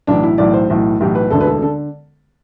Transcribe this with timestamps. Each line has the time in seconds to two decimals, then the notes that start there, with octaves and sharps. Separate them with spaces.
0.07 B1 A2 E3 D4
0.23 E4
0.38 B1 A2 E3 D5
0.53 C5
0.69 B1 A2 E3
1.00 B1 A2 E3 G4
1.15 B4
1.30 E1 D2 D3 A4
1.41 B4
1.47 A4
1.62 D3 A4